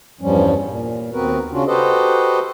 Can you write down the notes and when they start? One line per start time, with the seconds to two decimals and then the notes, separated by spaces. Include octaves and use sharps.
0.21 E2 G2 F3 G3 C#4
0.64 A#2
1.12 D#2 B3 C4 F#4 A#4 B4
1.51 C#3 C#4 D4 F4 F#4
1.66 F#4 G4 A4 B4 C5 D#5